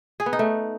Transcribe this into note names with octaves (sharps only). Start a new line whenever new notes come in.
G#4
B3
D#4
A3